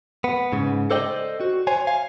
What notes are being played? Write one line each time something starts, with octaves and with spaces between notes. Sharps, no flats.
B3
G#2 C#3
A4 C5 D5 D#5 G5
F#4
C5 C#5 G#5
F5 G#5